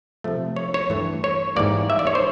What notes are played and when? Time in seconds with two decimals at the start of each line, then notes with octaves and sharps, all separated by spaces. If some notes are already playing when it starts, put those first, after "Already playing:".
0.24 C3 F3 A3
0.56 C#5
0.74 C#5
0.90 G2 E3 A3
1.24 C#5
1.56 G#2 E3 G3 A#3 D5
1.90 E5
1.99 D5
2.07 C#5
2.15 C5